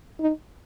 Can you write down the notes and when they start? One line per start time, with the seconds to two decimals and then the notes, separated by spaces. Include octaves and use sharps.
0.20 D#4